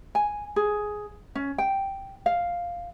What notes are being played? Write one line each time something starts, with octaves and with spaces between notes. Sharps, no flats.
G#5
G#4
C#4
G5
F5